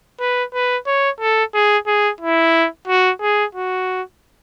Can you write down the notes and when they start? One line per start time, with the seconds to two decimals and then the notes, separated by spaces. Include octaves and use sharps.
0.20 B4
0.54 B4
0.87 C#5
1.20 A4
1.54 G#4
1.87 G#4
2.21 E4
2.88 F#4
3.21 G#4
3.55 F#4